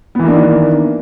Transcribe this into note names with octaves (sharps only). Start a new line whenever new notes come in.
D#3 E3 A#3 B3 D4